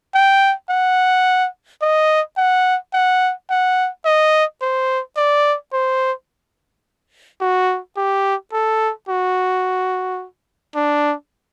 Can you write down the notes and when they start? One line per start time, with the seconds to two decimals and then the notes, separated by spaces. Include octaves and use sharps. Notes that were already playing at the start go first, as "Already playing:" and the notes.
0.15 G5
0.70 F#5
1.82 D#5
2.38 F#5
2.94 F#5
3.50 F#5
4.05 D#5
4.62 C5
5.17 D5
5.73 C5
7.41 F#4
7.96 G4
8.53 A4
9.09 F#4
10.75 D4